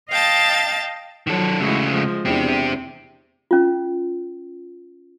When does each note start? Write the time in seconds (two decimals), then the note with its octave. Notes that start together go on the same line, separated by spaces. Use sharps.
0.10 D#5 F5 G5 A5 A6
1.27 D#3 F3 F#3 F#4 A4
1.60 C#3 E3 G#3 A3 F#4
1.91 F3 G#3
2.25 E2 C4 D4 G4
3.51 C#4 F4